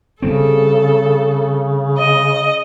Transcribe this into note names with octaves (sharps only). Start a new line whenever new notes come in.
C#3 G3 A3 C4 A4
D#5